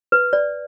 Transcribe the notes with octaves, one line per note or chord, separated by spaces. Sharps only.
B4
D5